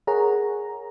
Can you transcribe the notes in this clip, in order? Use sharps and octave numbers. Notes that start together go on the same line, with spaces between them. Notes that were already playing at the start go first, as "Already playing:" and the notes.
G#4 A#4 C#5 F#5 A#5